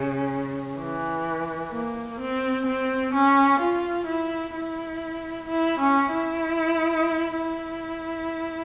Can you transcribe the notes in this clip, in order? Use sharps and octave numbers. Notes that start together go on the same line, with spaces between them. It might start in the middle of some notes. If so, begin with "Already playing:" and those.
Already playing: C#3
E3
A#3
C4
C4
C#4
F4
E4
E4
E4
C#4
E4
E4